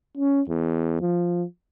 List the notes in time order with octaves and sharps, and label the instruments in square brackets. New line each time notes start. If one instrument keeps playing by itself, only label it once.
[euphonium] C#4
E2
F3